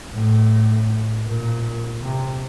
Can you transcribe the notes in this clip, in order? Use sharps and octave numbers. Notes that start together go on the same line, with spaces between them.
A2
A#2
C3